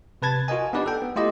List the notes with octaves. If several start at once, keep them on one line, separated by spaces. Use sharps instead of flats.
C3 B4 A5 G#6 A6
F4 F#4 A#4 D#5 G#5
B3 D4 D#4 G4 B4 D5
A4 G5
B3
A3 E4 F4 G4 D#5